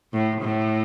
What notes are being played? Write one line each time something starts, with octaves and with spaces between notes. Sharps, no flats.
A2
A2